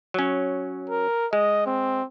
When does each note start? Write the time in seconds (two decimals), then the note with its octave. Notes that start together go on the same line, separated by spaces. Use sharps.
0.14 F#3 C#4
0.90 A#4
1.33 G#3 D#5
1.66 C4